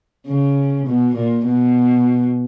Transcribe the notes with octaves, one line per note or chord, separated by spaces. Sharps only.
C#3
B2
A#2
B2